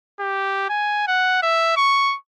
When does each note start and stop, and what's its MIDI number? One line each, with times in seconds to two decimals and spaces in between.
0.20 0.66 67
0.70 1.05 80
1.08 1.38 78
1.43 1.73 76
1.77 2.16 85